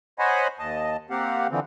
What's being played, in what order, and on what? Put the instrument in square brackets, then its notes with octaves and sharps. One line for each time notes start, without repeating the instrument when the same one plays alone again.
[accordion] C5 C#5 D#5 F#5 G#5 B5
D#2 D#5 A5
A#3 C4 G4 F5 F#5
D3 E3 F3 C4